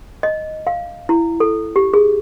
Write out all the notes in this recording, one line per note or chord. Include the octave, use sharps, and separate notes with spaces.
D#5
F5
E4
A4
G4
G#4